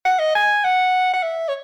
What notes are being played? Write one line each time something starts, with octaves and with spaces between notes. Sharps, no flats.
F#5
D#5
G#5
F#5
F#5
E5
C#5